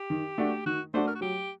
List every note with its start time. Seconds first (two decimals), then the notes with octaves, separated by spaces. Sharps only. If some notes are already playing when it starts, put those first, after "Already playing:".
Already playing: G4
0.10 D#3
0.38 A3 D4 F#4
0.66 D#3 F#4
0.94 A3 D4 F#4 C5
1.07 A#4
1.15 F#4
1.21 F#3 G4